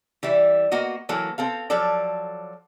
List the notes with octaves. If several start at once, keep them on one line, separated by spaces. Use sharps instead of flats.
E3 G3 E4
A#3 B3 F#4 D#5
E3 F#3 A#3 A4
C4 A4 F5
F3 F#3 A4 D5